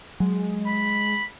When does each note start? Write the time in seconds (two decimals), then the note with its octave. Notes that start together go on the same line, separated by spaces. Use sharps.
0.20 F#3 G#3
0.67 B5